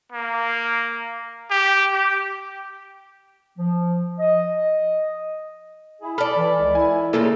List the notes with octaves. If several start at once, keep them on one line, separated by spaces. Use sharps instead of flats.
A#3
G4
G4
F3
D#5
E4 G#4
A4 D5 A5 B5 F6
E3
C#2
E4 G#5
A2 C#3 A#3 F4 A4